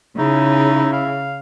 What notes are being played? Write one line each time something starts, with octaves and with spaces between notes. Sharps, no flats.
C#3 D#4 E4
F5